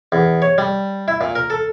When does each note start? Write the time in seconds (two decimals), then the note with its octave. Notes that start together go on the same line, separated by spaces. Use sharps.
0.12 E2
0.42 C#5
0.58 G3
1.08 E4
1.21 A#2
1.35 A#4
1.50 A4